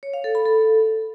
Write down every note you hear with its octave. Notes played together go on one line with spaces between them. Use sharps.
C#5
F5
A4
B5
A4